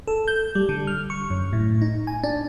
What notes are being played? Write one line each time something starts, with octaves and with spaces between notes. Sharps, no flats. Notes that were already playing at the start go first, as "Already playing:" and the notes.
A4
G6
G3
D3
F6
C#6
F#2
A2
D#4
G#5
D4